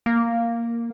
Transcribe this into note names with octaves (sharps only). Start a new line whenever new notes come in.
A#3